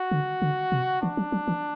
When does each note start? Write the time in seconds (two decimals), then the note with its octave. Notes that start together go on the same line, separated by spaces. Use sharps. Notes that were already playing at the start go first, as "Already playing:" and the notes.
Already playing: F#4
0.11 D3
0.42 D3
0.72 C3
1.02 E3 D4
1.17 F#3
1.32 F#3
1.48 E3